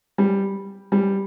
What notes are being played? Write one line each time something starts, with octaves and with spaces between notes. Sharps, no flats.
G3
G3